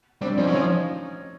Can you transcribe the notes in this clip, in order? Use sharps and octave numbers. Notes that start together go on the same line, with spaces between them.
G3 C4 D4
F3 C#4 D#4
F#3
F3 C#4 D#4